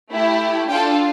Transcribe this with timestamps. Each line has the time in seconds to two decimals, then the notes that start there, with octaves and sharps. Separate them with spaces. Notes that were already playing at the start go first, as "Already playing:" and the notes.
0.11 A3 E4 G4
0.69 D4 F4 G4 A4 G5